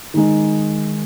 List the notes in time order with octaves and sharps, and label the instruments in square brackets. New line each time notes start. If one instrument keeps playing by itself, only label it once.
[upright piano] D#3 G#3 D#4